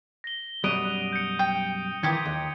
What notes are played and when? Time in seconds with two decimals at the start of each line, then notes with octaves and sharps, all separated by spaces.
0.24 A#6 G7
0.64 F#2 B2 G3 F#5 D#6 D7 D#7
1.13 G6 C#7
1.39 G5
2.03 D#3 E3 D#4 F4 G4 G#6 C#7
2.25 D#2